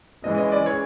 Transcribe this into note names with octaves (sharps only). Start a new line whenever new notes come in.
E3 G#3 C#4 D#5
D#5
D5
C#5